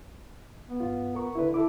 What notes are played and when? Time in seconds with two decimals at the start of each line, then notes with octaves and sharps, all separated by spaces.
0.69 B3
0.80 G2 F4
1.15 A#4 C#6
1.35 D3 E4 B4
1.54 E4 A4 D6